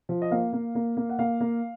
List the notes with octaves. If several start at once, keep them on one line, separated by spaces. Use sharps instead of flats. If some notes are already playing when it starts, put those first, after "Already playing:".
F3
D#5
A#3 F5
A#3
A#3
A#3
F#5
A#3 F5
A#3